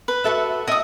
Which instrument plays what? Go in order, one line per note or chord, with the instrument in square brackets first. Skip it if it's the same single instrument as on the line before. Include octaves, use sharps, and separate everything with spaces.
[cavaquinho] B4
[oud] F#4 A4 E5
[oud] E4 [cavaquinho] D#5 D#6